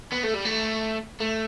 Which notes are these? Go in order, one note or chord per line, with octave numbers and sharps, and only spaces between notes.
B3
A3
G3
A3
A3